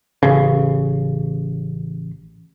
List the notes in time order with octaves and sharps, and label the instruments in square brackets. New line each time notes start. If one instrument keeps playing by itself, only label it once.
[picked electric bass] A1 C#3